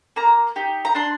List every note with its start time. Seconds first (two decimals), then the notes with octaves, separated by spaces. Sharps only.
0.16 A#3 A#5
0.56 D#4 G4
0.85 A#5
0.95 D4 C6